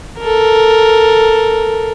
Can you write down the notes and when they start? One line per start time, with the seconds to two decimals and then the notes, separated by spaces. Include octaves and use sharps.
0.19 A4 A#4